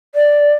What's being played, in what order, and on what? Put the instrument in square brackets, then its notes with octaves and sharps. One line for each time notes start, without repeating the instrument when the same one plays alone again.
[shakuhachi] D5